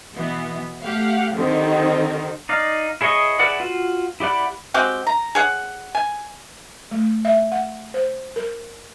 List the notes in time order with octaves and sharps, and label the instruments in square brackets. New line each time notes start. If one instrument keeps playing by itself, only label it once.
[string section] B2 E3 B3
A3 G4 F5 F#5
D3 D#3 C4 G4
[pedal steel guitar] D#4 D5 F5
E4 G#4 C#5 D#5 C#6
E4 G#4 B4 D5 F#5
F4 F#4
E4 G4 D5 F#5 B5
[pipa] G#3 C4 F#4 G4
A#5
G#4 C#5 F#5
G#5
[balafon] A3
E5
F#5
C5
A#4